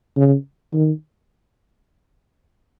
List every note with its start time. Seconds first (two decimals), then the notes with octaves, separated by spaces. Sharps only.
0.17 C#3
0.73 D#3